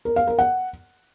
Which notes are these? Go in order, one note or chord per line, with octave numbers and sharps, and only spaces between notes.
A#4
F5
A#4
F#5